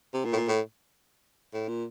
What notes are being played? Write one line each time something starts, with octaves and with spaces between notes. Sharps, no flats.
C3
A#2
A2
A#2
A2
A2
A#2